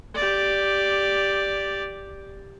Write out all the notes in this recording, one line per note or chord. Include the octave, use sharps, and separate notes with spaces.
G4 D5